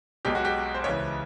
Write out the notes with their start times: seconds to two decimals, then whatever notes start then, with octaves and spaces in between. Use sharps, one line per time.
0.25 B1 B2 G#3 G4
0.35 F#4
0.45 G4
0.74 C5
0.84 C#2 C#3 E3 C#5